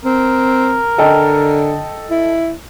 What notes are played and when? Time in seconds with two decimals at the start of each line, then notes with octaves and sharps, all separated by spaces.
0.05 C4 A#4
0.98 D3 A4 D#5 G5
2.10 E4